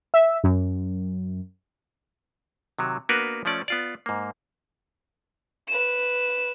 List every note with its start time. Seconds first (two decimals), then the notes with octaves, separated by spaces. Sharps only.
0.14 E5
0.44 F#2
2.79 C3 D#3 F#3
3.09 A#3 B3 D4 F#4 A#4 B4
3.45 F3 A3 C#4 D5
3.68 B3 F4 D5
4.06 G#2 A#3
5.68 B4 E7